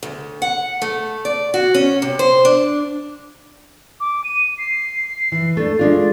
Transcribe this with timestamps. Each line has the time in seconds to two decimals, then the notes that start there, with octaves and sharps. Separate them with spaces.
0.03 D2
0.42 F#5
0.82 A3
1.25 D5
1.54 F#4
1.74 C#4
2.02 C3
2.19 C5
2.45 D4
4.00 D6
4.24 D#7
4.58 C7
5.32 E3
5.57 A3 D4 A6
5.79 G#3 D4 F4